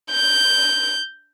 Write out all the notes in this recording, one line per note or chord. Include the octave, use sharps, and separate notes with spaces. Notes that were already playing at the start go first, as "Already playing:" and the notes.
G6